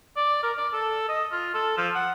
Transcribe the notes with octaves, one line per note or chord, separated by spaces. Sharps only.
D5
A#4
D5
A4
D#5
F4
A4
F3
F#5